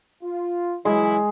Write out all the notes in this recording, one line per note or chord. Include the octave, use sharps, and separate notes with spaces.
F4
E3 F#3 G#3 E4